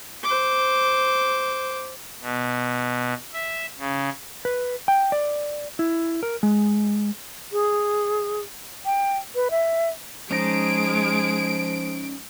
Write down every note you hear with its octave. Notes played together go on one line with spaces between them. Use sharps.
C5 D6
B2
E5
C#3
B4
G5
D5
E4
A#4
G#3
G#4
G5
B4
E5
F3 G#3 C#4 D#4 A#5 D7